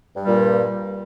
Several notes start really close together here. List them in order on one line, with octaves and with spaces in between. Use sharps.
G2 G3 A#2